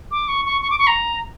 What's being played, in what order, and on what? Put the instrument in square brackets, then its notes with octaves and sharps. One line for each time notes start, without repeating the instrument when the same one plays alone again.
[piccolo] D6
C#6
C#6
C#6
D6
C#6
A#5